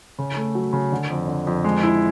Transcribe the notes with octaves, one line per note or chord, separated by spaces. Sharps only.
C#3
A3
F#3
C#3
D3
F2
D3
F2
G#3
E4